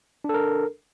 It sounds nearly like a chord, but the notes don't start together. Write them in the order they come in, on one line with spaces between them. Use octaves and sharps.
D4 A4 A#4